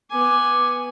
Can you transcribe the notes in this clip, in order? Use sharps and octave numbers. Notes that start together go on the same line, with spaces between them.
B3 G#5 D6